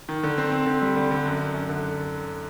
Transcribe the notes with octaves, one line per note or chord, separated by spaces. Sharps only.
D#3
D3
C4
C4
D3
G3
D3
D3
F#2
F#2
F#2
D3